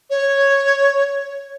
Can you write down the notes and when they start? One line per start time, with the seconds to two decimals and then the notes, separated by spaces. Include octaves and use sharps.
0.10 C#5